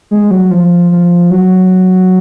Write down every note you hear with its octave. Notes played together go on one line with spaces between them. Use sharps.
G#3
F#3
F3
F3
F#3